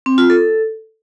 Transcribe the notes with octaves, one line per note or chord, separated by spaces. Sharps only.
C4
F4
A4